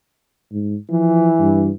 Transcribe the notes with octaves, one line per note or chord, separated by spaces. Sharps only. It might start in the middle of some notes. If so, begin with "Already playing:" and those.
G#2
E3 F3
G2